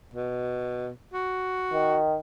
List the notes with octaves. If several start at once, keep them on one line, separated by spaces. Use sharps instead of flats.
B2
F#4
D#3